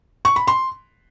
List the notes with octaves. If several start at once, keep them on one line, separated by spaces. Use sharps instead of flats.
C#6
B5
C6